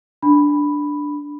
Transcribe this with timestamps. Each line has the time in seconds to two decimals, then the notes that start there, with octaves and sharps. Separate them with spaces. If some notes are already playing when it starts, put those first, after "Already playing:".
0.23 D4 B5